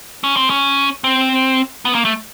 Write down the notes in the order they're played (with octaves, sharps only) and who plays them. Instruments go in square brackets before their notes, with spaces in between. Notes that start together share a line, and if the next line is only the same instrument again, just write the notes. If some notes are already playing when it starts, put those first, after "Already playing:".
[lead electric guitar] C#4
C4
C#4
C4
B3
A#3
A3